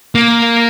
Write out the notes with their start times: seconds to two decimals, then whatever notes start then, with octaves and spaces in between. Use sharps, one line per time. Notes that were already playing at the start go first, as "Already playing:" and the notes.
0.15 A#3